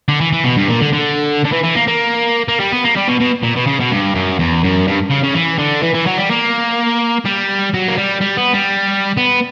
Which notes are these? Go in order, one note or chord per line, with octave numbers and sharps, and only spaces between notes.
D3
E3
E3
B2
G2
A#2
D3
D3
D3
E3
E3
A#3
A#3
A#3
G3
B3
A#3
G3
B2
B2
A#2
B2
C#3
B2
G2
F#2
E2
F#2
G2
C#3
C#3
E3
D3
E3
E3
F#3
G3
A#3
G3
F#3
A#3
G3
G3
B3
G3
B3